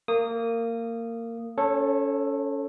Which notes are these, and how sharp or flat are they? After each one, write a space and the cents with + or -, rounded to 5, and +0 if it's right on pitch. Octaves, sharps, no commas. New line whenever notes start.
A#3 -20 D#6 -10
C#4 +20 A4 +5 C#5 -30